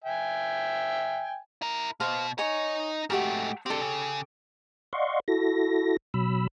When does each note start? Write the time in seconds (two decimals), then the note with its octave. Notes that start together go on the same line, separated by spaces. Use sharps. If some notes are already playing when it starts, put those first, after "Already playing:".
0.04 E5 G5 G#5
1.62 E4 A#4
2.00 B2 C5 F5
2.38 D#4 C#5 D#5 G#5 A#5
3.10 G#2 A3 F#4 G4 A#4
3.66 C4 D4 G4 A4
3.81 C#3
4.93 D5 D#5 F5 F#5 C6 C#6
5.28 E4 F#4 A4 A#6
6.14 B2 F#3 B5 E6